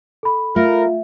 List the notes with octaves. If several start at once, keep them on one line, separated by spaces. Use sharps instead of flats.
A4 B5
A3 F4 A#4